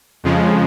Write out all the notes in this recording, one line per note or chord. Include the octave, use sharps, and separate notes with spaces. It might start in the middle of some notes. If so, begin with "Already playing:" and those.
F2 C#3 F3 G#3